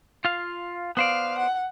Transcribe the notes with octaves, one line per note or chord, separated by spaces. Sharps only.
F4 F5
B3 C5 D5 F5
F#5